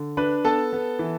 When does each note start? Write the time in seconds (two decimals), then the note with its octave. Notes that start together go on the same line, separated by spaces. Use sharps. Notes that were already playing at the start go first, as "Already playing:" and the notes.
Already playing: D3
0.17 D4 B4 B5
0.44 B3 A4 A5
0.73 B3
0.99 E3